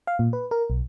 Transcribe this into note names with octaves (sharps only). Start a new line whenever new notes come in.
F5
A#2
B4
A#4
B1